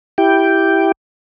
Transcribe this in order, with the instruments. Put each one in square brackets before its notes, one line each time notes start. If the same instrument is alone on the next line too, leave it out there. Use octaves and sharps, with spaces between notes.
[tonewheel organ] E4 G4 G5